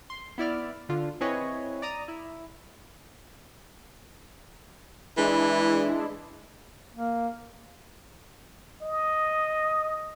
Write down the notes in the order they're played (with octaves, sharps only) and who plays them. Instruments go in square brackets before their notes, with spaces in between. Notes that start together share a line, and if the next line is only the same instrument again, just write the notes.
[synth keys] C6
B3 E4 D5 F6
D3 F4
C4 E4 G#4 B4 C#5 D#5
D5 A#5 D#6
E4
[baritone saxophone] E3 [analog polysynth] G#3 D4 E4
[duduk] A#3
[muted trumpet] D#5